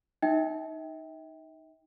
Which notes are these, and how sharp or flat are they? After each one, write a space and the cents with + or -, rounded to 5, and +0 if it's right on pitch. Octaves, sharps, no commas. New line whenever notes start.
D#4 +0 E5 -40 G5 +10